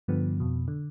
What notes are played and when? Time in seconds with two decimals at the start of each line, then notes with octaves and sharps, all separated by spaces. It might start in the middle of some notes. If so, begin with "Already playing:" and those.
0.08 G2 D3 F3 B3
0.40 F2 B2
0.68 D3